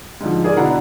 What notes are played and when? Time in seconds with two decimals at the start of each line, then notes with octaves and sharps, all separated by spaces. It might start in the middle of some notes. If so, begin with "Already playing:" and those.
0.21 G#2 D3 F3
0.44 D#4 G#4 A#4 D5
0.57 B2 D3 D4 E4 F#5 A#5